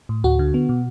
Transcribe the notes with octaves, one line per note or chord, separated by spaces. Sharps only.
A2
D2 F#4
D3
B3
B2